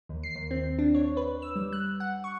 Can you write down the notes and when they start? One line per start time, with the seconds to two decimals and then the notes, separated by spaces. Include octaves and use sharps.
0.09 D#2
0.23 C7
0.35 D#2
0.51 C4
0.79 D4
0.94 C#5
1.17 B4
1.42 E6
1.56 G3
1.73 F#6
2.00 F#5
2.24 C#6